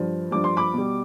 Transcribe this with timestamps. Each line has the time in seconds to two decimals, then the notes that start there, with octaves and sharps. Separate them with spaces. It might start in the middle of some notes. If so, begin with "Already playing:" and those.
Already playing: G2 F3
0.31 G2 F3 D6
0.44 C6
0.57 B5 D6
0.74 B2 G3